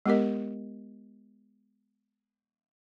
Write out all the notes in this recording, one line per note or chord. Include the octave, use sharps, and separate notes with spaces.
G#3 B3 G4 A#4 D#5